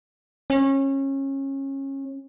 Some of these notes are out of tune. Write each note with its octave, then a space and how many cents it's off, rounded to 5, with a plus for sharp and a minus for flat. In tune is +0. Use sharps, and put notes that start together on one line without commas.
C#4 -25